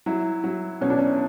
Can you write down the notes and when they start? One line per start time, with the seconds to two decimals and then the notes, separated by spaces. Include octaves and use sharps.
0.06 F#3 E4
0.44 F#3
0.81 B2 C#4
0.90 D4
0.99 C#4